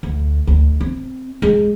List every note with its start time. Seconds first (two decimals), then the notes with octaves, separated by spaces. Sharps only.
0.03 D2
0.47 D2
0.81 C4
1.42 G#3